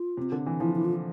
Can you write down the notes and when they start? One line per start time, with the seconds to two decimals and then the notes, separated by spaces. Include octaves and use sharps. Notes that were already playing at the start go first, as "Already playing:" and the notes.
Already playing: F4
0.17 C3
0.32 D3
0.46 E3
0.60 F3 E4
0.75 E4
0.85 F4